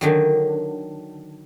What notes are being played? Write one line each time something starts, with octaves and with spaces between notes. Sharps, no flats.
D3 D#3 F#3